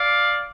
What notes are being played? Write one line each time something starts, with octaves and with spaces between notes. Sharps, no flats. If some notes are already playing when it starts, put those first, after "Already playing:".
Already playing: D5 F5